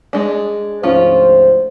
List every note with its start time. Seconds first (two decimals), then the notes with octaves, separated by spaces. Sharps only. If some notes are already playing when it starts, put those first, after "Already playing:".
0.13 G#3 D4
0.83 D2 G#2 F3 C#4 F4 C5